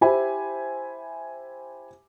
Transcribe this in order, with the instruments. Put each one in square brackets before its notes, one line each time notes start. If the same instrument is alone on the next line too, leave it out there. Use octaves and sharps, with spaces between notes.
[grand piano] E4 G4 C5 E5 G#5 B5